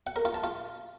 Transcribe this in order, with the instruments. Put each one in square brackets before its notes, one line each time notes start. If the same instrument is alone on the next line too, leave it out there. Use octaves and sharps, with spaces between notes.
[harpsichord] F#5
A#4
F4
A5
F4